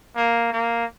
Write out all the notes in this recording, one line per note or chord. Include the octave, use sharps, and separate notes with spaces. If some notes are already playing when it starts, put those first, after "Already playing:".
A#3
A#3